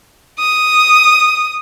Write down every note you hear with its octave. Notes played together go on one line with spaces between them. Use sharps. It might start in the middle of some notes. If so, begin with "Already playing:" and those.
D#6